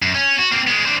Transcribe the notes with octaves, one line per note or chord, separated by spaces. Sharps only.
F#2
C#4
F#4
A#3 C4
G#3 B3
D4 C5